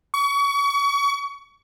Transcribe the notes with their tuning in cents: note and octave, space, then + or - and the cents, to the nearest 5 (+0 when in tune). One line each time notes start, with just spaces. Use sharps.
C#6 +30